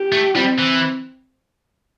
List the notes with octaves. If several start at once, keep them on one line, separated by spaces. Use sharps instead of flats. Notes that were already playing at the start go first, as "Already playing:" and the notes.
Already playing: G4
A3
G3 C4
E3